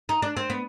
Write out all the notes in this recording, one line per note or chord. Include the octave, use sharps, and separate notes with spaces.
D#4
D4
C4
B3